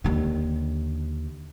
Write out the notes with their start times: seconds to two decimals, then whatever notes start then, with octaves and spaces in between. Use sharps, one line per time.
0.04 D#2 D3